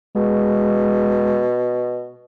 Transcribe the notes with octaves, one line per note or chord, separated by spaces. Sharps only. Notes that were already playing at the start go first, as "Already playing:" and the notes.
B2 G#3